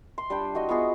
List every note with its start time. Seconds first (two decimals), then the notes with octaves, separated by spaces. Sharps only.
0.18 C6
0.30 G3 D4 G5
0.54 E4 F#4 D#5 C6
0.69 B3 F4 F#4 G#4